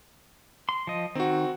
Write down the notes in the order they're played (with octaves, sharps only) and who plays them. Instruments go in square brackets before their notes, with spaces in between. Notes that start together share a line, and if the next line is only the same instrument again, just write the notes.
[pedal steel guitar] C6
F3 D#5
[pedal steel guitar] D#3 [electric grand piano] C4 F#4